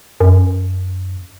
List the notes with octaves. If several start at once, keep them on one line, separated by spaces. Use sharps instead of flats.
F#2